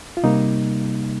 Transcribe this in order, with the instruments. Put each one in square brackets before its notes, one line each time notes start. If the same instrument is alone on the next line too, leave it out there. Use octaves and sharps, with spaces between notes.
[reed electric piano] F4
C3 G3 A#3 D#4